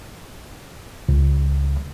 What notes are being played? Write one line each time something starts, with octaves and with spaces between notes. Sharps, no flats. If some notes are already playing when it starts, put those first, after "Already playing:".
C#2